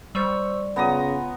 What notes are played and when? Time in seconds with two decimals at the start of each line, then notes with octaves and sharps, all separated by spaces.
0.15 G3 C5 C#6 E6
0.76 C#3 B3 C#4 F4 A#5 D#6